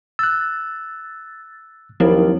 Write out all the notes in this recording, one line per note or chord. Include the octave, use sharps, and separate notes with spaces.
E6 F#6 A6
D#2 F3 F#3 C4 E4